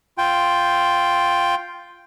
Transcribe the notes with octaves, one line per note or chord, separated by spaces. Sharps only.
F4 G5